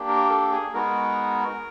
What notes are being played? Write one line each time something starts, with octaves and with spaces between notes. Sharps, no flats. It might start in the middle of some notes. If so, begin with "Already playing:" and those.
Already playing: A#3 D4 G4
A#4
A4
G#4
G#3 B3 D#4 F#4 A#4